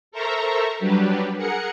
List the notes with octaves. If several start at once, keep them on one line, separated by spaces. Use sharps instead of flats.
A4 A#4 C5 E5 A#5 C#6
F#3 G3 D4 G4 B4
G#4 A#4 F#5 C#7